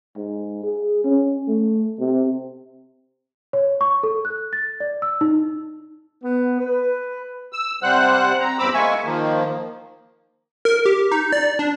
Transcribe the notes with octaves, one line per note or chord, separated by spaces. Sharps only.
G#2
G#4
C#4
A3
C3
C#5
C#6
A4
F#6
A6
D5
E6
D#4
B3
B4
E6
C3 G3 C5 F#5 F#6
C4 A#5
E2 G2 C4 B5 D6 E6
G#3 A#3 E5 G#5 C#6
D#3 F3 A#3
A#4
G4
D#4
D5
D4